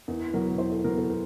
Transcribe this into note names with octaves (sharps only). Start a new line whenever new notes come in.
E2 A#4
B2 F#3 B3 A#4
E2 C5
A4
B2 F#3 B3 A#4
A4
A#4